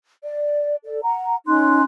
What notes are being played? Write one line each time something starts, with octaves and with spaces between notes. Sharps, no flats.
D5
A4 D5
F#5 A#5
C#4 D#4 C6 F#6